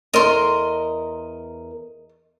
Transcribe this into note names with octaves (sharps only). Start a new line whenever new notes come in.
E2 A#4 D#5 A#5 C6